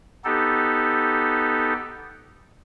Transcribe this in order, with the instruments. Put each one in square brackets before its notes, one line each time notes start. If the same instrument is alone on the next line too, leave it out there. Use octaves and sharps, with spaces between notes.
[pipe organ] B3 D#4 G4 A4